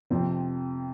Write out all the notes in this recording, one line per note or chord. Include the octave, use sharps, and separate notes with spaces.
F2 C3 F3 C4